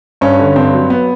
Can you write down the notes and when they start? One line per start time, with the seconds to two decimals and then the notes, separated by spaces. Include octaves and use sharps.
0.21 G2 C#4
0.39 D3
0.56 G2 C4
0.73 F#3
0.90 B3